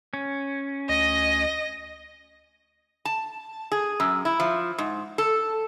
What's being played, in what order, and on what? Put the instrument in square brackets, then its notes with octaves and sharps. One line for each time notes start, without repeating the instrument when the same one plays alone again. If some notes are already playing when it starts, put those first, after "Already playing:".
[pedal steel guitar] C#4
[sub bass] D2 [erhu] D#5 [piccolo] A#6
[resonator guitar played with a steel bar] A5
G#4
F#2
E4
F3
G#2
A4